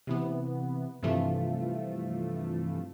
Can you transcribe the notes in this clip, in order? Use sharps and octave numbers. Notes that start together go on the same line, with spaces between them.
C3 E3 B3
G2 C3 E3 F3 A3 F4